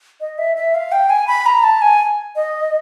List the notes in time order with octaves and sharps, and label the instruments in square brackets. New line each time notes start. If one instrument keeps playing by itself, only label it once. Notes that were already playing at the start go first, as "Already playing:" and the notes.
[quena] D#5
E5
E5
F5
G5
G#5
B5
A#5
A5
G#5
D#5